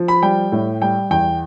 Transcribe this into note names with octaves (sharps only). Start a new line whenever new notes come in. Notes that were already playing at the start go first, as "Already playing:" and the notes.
Already playing: F3
B5
G3 G5
A2
G3 G5
E2 G5